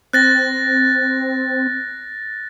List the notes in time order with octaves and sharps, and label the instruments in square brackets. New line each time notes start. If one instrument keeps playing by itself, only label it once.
[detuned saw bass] C4 [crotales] F#6 A6 A#6